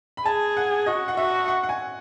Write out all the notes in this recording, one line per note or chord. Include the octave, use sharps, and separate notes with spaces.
B5
G#4 A5
F#5
F#4 D#5
F#5
F#4 E5
F#5
F#5
G#5